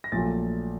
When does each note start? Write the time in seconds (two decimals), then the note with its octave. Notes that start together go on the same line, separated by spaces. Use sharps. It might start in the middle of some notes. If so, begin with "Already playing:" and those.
0.04 A#6
0.12 A#1 A#2 F#3 A3 A6